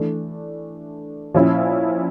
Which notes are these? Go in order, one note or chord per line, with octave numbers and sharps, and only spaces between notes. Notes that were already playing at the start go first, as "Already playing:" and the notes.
Already playing: E3 A3 D4
A#2 F3 C#4 E4